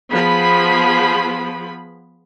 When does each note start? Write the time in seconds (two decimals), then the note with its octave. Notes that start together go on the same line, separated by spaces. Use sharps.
0.11 F3 B3 G#4 B5